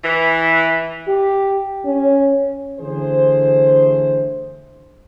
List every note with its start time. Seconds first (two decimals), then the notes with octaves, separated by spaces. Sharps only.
0.03 E3
1.08 G4
1.86 C#4
2.80 D3 E3 A3 G#4 C5